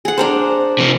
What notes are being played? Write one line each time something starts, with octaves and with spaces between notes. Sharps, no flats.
G#4 F#5
D4 A#4 C5
C3 F3